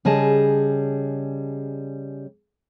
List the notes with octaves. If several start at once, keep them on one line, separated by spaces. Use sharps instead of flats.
C#3 G3 G#4 D#5 A5